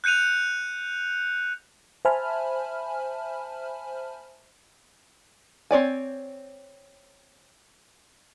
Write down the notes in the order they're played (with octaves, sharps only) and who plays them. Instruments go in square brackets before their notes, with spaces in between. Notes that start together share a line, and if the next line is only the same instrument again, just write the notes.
[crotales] F#6 G6 C#7 D#7 F7
[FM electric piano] C5 E5 G#5 A5 B5 F6
[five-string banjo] C4 C#5 D5 G#5